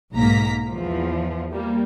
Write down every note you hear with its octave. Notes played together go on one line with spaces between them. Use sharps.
B1 G#2 A#3 A#5 B6
E2 F3
G3 A#3